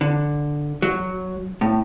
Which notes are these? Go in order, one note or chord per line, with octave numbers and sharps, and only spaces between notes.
D3
F#3
A2